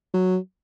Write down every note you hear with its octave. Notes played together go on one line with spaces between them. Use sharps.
F#3